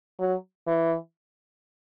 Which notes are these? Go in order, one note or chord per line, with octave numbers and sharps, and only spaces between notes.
F#3
E3